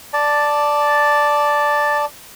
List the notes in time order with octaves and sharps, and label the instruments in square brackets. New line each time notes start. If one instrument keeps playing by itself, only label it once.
[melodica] D5 A5